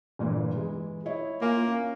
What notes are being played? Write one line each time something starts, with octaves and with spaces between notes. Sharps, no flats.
G1 A#2 E3
E3 G#3
E4 C#5 D#5
A#3 F4 G#5
C#4